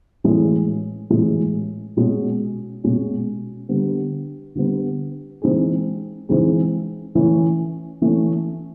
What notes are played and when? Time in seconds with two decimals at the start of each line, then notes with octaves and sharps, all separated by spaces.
0.24 A2 E3 G#3
1.10 A2 E3 G#3
1.97 B2 G#3 C#4
2.84 B2 G#3 C#4
3.69 D3 G3 B3
4.55 D3 G3 B3
5.42 E3 G#3 C4 D#4 G#4
6.29 E3 G#3 C4 D#4 G#4
7.15 E3 A3 C#4
8.02 E3 A3 C#4